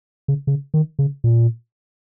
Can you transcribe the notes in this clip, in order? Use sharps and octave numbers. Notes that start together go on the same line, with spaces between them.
C#3
C#3
D#3
C#3
A#2